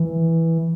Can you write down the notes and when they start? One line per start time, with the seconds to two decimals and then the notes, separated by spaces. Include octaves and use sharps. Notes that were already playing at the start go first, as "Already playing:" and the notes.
Already playing: E3